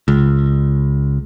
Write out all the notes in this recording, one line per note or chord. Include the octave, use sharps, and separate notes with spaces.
C#2